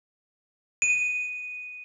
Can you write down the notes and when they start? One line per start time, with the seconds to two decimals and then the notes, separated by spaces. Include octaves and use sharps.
0.82 D#7